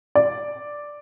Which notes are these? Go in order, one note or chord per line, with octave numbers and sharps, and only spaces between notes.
D5